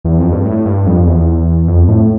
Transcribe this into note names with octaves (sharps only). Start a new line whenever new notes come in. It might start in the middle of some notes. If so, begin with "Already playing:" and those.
E2
F2
G2
A2
G2
F2
E2
F2
A2